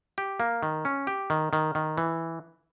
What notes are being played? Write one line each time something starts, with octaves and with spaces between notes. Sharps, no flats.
G4
A#3
D#3
C#4
G4
D#3
D#3
D#3
E3